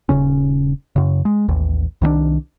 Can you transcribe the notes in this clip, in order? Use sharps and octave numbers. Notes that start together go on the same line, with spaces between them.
D#1 D#2 C#3 C#4
F#2 C#3
G#3
A1 D#2
C2 D#3 G3 D4